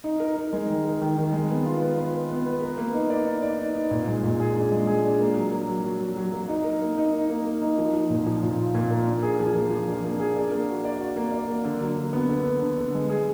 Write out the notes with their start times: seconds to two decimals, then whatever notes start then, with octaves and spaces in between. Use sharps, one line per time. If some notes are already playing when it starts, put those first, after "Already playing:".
0.04 D#4
0.20 A#4
0.36 D#4
0.53 G#3
0.69 D#3
0.85 A#4
1.01 D#3
1.18 D#3
1.32 G#3
1.50 B3
1.65 F4
1.82 B4
1.98 B4
2.14 B4
2.30 B3
2.46 B4
2.61 A#4
2.78 A#3
2.94 D#4
3.10 D5
3.26 D#4
3.43 D5
3.59 D#4
3.75 D#4
3.91 A#2
4.07 G#3
4.23 A#2
4.40 G#4
4.56 D4
4.72 G#3
4.87 G#4
5.04 D4
5.20 A#3
5.37 F#3
5.52 F#3
5.68 F#3
5.85 F#3
6.00 F#3
6.17 F#3
6.32 A#3
6.48 D#4
6.64 A#4
6.82 A#3
6.98 D#4
7.14 D#4
7.30 A#3
7.45 A#3
7.62 D#4
7.78 F3
7.93 F3
8.10 A#2
8.27 F3
8.43 A#2
8.58 F4
8.75 A#2
8.91 A#3
9.07 D4
9.23 G#4
9.39 F3
9.55 A#3
9.71 F3
9.88 D4
10.04 A#3
10.20 G#4
10.36 D4
10.51 A#3
10.69 F#4
10.85 D5
11.01 F#4
11.16 A#3
11.32 D5
11.48 A#3
11.64 D3
11.81 F#3
11.97 D3
12.13 B3
12.29 D3
12.46 D3
12.62 D3
12.78 D3
12.94 G#3
13.10 G#4